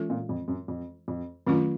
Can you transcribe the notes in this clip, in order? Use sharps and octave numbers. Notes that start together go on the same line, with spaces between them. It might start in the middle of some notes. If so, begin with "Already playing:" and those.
Already playing: E3 G#3 C#4 F4 A4
A#2
F2
F#2
F2
F2
F#2 D#3 F#3 A3 C#4 F4